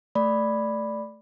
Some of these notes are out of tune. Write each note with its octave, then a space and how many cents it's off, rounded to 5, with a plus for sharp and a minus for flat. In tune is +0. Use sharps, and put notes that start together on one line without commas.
A3 +0 D5 +0 B5 +0